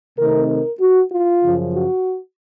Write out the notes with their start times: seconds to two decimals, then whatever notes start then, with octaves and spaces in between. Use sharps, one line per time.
0.18 C3 D#3 A3 C4 D#4 A#4
0.49 A#4
0.80 F#4
1.11 F4
1.43 F#2 C#3 F3
1.74 F#4